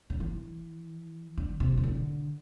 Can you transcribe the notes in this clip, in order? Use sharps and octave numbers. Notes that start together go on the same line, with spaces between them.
D3
E3
D3
C3
C3
D3